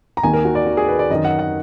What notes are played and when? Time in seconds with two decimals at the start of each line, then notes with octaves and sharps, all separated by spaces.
0.17 A#5
0.23 D#2 D#3 G#5
0.33 A#4
0.45 F#4
0.55 D5
0.66 F#4
0.77 G#4
0.88 B4
0.99 D5
1.10 F#2 D#3 D#5
1.25 F#5
1.39 F#5